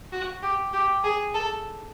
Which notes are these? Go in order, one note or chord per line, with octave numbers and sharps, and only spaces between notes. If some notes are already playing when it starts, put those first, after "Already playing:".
F#4
G4
G4
G#4
A4